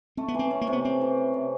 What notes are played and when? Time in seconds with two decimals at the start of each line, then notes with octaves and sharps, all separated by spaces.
0.17 A3 C4
0.28 B3
0.34 E3 C4
0.51 C#4
0.61 A#3
0.67 C3
0.73 B3
0.84 A3 C4
1.01 E3
1.18 C#4
1.34 C3